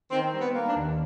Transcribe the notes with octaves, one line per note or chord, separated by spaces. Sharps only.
D#3 C4
G3
B3
A#3
D4
D#2